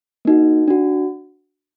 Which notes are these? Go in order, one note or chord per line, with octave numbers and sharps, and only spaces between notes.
A#3 D#4 F#4
D4 F#4